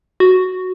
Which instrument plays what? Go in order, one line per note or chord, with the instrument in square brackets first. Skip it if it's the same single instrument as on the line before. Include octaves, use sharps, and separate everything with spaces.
[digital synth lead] F#4